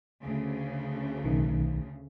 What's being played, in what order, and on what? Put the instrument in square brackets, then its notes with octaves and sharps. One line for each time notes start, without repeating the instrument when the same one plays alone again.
[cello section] D2 C#3
[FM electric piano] B1 D#3